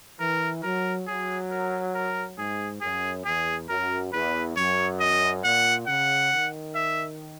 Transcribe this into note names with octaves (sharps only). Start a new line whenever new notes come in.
E3 A#4
F#3 A#4
F#3 G#4
A#4
A#4
G#2 G#4
F#2 G#4
E2 G#4
F#2 A#4
E2 B4
F#2 C#5
D#5
A#2 F#5
C#3 F#5
D#3
E5